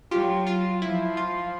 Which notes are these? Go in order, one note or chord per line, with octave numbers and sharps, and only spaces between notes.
F#3 F4 G4
F4
F3 E4
F4